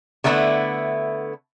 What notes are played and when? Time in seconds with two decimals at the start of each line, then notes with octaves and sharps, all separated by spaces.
0.24 D3 A3 B3 D#4 E4